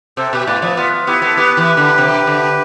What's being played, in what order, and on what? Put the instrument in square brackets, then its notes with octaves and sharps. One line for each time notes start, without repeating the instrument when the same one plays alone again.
[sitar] C3 [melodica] A4 C5
[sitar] B2 [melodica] G4 B4
[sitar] A2 [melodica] B4 D5
[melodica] C5
[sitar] F3 [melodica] B4 D5
[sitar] B3 [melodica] F4
[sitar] B3 [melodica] E4 G4
[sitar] B3 [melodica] A4
[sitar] B3 [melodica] G4 B4
[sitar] E3
D3
C3
D3